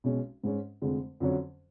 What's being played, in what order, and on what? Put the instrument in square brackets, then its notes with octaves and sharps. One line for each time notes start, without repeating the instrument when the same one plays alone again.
[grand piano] B1 B2 G#3 C#4
G#2 G#3 C#4
F1 F2 D3 G#3
F2 D3 F#3 C#4